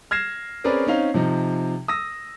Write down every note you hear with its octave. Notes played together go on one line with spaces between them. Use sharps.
F6 G#6 A#6 C7 E7
C4 C#4 G#4 A#4 B4 D5
C4 C#4 D#4 F5
C3 F3 D#4
D#6 E6 A#6